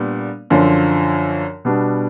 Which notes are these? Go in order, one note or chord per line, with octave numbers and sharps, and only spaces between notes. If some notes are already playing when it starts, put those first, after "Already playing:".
Already playing: A#2 G3 B3 D4
F#2 D3 F3
B2 G3 B3 D4